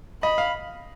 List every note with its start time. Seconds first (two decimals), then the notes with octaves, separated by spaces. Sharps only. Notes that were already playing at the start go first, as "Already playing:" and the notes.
0.23 D#5 B5
0.38 F5